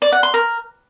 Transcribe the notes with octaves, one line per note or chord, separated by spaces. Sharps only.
D5
F#5
C6
A#4